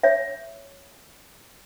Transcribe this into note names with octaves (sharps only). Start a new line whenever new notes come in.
C#5 E5